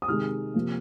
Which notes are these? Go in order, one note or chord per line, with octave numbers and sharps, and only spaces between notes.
D#6
C3 D#3 G#3 F6
C3 F3 A#3